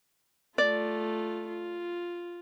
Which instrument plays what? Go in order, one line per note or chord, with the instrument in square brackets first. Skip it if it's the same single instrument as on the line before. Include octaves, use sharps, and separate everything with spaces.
[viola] A3 F4 [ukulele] D5
[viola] F4